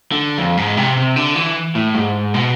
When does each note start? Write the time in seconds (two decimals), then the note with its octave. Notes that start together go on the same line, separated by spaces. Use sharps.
0.12 D3
0.38 F2
0.57 G#2
0.77 C3
0.97 C3
1.16 D3
1.36 E3
1.75 A2
1.95 G#2
2.34 B2